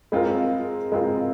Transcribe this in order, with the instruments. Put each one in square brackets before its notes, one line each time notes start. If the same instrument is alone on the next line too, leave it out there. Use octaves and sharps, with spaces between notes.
[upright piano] G#3 C4 F4 A#4
G#3 C4 F4 A#4